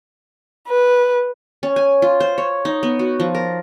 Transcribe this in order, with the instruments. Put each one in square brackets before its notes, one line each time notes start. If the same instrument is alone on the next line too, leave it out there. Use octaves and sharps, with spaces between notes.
[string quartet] B4
[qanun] C#4
G#5
F4
C5
C#5
D#4
B3
F#4
F3
A#4